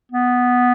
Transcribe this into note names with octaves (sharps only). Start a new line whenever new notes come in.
B3